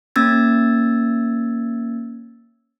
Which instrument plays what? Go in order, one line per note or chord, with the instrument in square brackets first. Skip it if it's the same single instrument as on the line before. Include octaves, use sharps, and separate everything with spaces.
[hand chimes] A#3 C#4 E6 G#6 A6